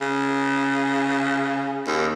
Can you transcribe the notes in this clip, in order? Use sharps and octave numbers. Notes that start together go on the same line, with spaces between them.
C#3
D#2